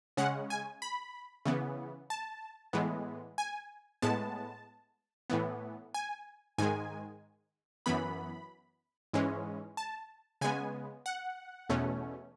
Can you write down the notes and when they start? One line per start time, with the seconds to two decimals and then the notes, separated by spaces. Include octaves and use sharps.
0.17 C#3 G#3 C#4 F#5
0.50 G#5
0.82 B5
1.45 C#3 E3 B3
2.10 A5
2.73 A2 E3 G#3 B3
3.38 G#5
4.02 A2 G#3 B3 A5
5.30 A2 E3 B3
5.94 G#5
6.58 G#2 D#3 G#3 G#5
7.86 F#2 E3 B3 B5
9.14 G#2 E3 G#3 C#4
9.77 A5
10.41 C#3 G#3 B3 G#5
11.06 F#5
11.69 E2 B2 A3 C#4